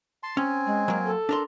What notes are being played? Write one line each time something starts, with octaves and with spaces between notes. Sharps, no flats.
A5 C6
C4 C#4 G#5
G#3
F#3 A#3
A4
D4 A#4 C6